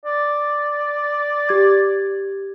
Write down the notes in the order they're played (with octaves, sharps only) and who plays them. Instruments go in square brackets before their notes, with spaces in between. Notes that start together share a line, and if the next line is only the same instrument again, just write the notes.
[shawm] D5
[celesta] G4 G#6